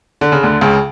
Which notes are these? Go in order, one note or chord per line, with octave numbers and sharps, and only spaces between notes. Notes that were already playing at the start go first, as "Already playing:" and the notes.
D3
C#3
D2 D3
C#2 C#3